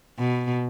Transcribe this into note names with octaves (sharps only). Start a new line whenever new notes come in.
B2